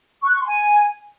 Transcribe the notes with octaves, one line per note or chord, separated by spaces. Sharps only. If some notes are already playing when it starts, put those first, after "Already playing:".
C#6
F#6
C#6
C6
G#5